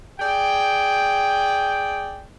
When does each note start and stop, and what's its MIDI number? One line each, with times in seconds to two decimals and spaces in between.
0.20 2.24 68
0.20 2.24 74
0.20 2.24 79